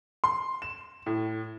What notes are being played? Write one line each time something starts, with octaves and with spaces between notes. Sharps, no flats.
C6
E7
A2